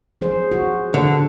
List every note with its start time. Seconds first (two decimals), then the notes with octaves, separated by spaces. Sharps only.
0.21 F3 G#4 C5
0.52 F#4
0.94 D3